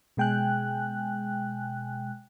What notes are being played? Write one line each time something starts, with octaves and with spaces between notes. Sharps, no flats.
B2 G#3 G5 G#5 F#6